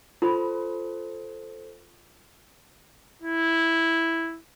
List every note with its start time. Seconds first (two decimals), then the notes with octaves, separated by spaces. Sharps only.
0.22 F4 A4 C5 B5
3.22 E4